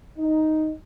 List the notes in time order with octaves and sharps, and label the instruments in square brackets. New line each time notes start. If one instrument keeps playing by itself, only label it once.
[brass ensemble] D#4